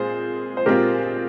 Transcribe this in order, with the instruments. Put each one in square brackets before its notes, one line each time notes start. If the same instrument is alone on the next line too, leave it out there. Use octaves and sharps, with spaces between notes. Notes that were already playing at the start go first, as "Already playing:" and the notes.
Already playing: [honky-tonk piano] A#2 G#3 C4 F4 [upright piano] G#4 C5
[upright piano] C5
[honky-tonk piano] A#2 G#3 C4 F4 [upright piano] G4 A#4